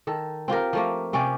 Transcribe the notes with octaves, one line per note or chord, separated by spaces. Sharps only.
D#3 A4
C4 F4 G4 A#4
F3 A3 A#3
C3 C#4 G4 D5